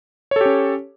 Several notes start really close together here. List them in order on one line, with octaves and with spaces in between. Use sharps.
C#5 A4 G4 C#4